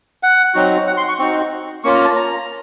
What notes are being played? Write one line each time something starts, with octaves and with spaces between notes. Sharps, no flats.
F#5
F#3 C4 D#4 F#4
F#5
C6
C#6
C4 D#4 F#4 C#6
A#3 C#4 F4 C#6
A#5
A5
A#5